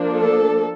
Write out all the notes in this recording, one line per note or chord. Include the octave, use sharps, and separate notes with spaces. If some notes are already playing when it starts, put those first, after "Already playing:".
Already playing: F3 A#3 D4
A4